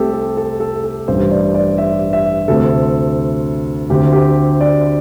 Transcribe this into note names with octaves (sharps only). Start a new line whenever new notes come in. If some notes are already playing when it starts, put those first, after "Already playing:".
Already playing: C2 C3 A3 C4 G4 A4
A4
A4
A4
A4
A1 G2 G3 C5
D5
D5
E5
E5
D2 C3 A3 C4 A4
D2 D3 C4 G4
G4
D5